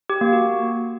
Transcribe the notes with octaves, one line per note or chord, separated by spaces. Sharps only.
G4
A#3
F#4